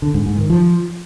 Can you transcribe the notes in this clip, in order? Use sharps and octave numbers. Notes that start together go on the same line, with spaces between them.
D3
G#2
G#2
D#3
F3